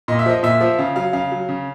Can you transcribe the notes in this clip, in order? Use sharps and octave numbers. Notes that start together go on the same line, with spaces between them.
A#2 D#5
E5
F3 D#5
A#2 E5
F3
C#3 F5
F#3 F5
C#3 F5
F#3
C#3